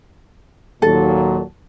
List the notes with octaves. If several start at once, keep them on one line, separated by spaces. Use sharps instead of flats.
D#2 A#2 F#3 A4